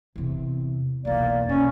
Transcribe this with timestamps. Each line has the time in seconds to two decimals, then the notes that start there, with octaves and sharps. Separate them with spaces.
0.16 E2 C3
1.05 B1 E2 A#3 D5
1.49 B2 C#4